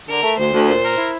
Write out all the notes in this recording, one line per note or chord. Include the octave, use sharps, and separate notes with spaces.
D3 A#4
A3
D2 C5
D2
A#2 C5
A#4
E4